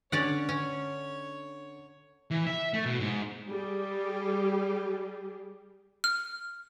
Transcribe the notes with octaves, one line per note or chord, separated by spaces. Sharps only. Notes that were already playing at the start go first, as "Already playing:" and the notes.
D3 C#4 C#5 D5 F#5
C#4
E3
E5
A3
B2
G#2
G3 G4 G#4
F6